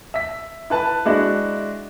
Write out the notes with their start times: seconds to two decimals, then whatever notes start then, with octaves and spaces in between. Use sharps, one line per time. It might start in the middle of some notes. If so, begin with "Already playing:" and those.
0.14 E5 B6
0.70 E4 B4 A5
1.06 G#3 D4 E4 F#4